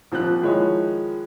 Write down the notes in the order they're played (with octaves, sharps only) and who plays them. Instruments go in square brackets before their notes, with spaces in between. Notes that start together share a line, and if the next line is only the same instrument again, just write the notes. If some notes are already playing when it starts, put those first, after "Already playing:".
[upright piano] D#1 F3 C4 F#6
D#3 F3 G#3 E4 C#5